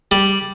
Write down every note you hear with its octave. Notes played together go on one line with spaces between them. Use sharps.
G3